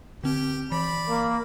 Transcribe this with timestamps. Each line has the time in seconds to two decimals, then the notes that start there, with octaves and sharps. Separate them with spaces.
0.24 D3 C4 G4
0.72 E3 D5 B5
1.09 A#3